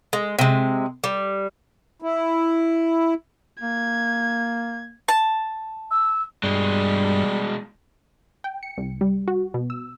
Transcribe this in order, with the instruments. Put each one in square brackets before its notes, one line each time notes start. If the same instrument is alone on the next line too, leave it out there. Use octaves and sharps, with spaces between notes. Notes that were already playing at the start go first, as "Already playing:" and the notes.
[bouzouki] G#3
C3 G#3
G3
[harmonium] E4
[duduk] A#3 [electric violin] G#6
[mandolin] A5
[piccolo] E6
[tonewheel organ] G2 [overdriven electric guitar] B2 G#3 [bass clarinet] G3
[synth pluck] G5
C#7
C2
G3
F#4
B2
E6